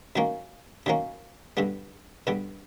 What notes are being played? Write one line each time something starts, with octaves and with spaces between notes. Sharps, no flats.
F#2 D#3 F#3 A#3 C#4
F#2 D#3 F#3 A#3 C#4
G2 D3 G3 B3
G2 D3 G3 B3